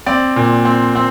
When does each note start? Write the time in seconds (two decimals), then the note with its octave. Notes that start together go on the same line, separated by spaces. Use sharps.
0.06 C4 D5
0.36 A#2
0.65 C4
0.95 C4